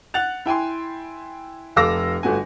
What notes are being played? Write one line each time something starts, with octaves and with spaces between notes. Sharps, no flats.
F#5 F#6 A6 F7
E4 G5 G#5 C6
F1 A4 F5 D6 E6 A#6
G1 A3 F#4 G#5